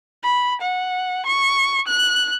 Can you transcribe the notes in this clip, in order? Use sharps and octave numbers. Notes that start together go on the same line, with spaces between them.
B5
F#5
C#6
F#6